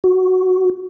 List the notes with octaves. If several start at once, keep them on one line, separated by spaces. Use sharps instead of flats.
F#4